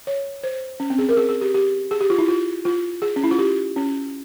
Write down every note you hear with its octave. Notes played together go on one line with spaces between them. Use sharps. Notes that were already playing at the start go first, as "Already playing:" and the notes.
C#5
C5
C#4
C4
G#4
A#4
G#4
G#4
G4
G4
G#4
G4
F4
E4
F4
F4
G#4
C#4
E4
F4
G4
C#4